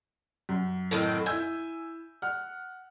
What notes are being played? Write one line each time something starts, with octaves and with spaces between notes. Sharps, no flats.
F#2
A2 D#3 C4
E4 G#5 E6 G6
F#5 F6